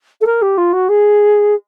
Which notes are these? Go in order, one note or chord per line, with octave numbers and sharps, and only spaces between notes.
A4
A#4
G4
F4
F#4
G#4